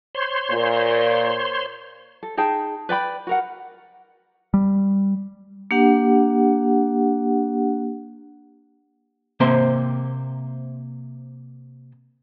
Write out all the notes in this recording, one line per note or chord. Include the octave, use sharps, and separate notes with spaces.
C5 C#5 C6
A#2
A4
D#4 G#4 G5 A5
B4 D5 G5 B5
F#4 A#4 F#5
G3
A#3 D4 G4 F#5
C3 A#3 C4 C5 C6